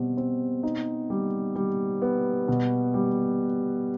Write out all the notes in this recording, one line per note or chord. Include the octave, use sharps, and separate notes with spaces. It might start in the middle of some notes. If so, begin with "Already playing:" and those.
Already playing: B2 G3 C4
C4
D#4
G3
G3
B3
B2
G3